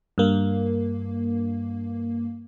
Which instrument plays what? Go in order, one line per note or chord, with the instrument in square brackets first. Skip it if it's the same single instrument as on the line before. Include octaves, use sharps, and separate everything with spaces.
[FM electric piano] G2 A#3